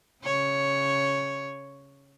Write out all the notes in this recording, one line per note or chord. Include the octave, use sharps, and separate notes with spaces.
C#3 C#5